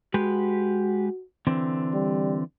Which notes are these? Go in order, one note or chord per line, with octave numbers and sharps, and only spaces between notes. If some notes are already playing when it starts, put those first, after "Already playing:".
G#3 F#4 G4 B4
D3 E3 C4
G3